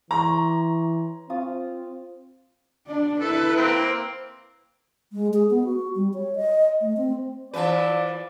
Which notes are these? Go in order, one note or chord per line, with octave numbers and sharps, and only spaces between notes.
E3 C#5 A#5 C6 D6
C4 F4 F5 D#6
D4 D5
E4 A4 B4
A#3 C4
G#3
G#4
B3
F#4
G3
C#5
D#5
A3
C4
E3 F3 B4 D5